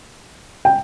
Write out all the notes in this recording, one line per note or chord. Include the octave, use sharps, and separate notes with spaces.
G5